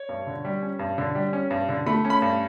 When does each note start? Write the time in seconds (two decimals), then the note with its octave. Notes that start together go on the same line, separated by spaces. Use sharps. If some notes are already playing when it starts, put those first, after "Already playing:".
Already playing: C#5
0.09 G2
0.27 D3
0.45 G3
0.62 C#4
0.79 G2
0.98 D3
1.15 G3
1.33 C#4
1.50 G2
1.69 D3
1.86 A3 B5
2.05 C#4
2.10 B5
2.22 G2